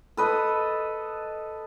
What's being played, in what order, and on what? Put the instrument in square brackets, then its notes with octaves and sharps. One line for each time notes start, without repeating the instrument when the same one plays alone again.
[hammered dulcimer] A4 B4 D#5